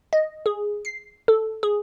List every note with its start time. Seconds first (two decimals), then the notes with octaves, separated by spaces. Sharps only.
0.13 D#5
0.46 G#4
0.85 C7
1.28 A4
1.63 G#4